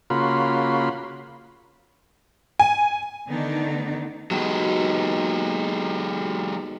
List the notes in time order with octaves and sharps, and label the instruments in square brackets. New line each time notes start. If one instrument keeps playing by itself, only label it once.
[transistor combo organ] C#3 A#3 F4 F#4 B5 C6
[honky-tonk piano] G#5
[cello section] D3 D#3 A3 B3 D4 D#4
[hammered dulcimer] B2 D#3 [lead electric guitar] F#3 G#3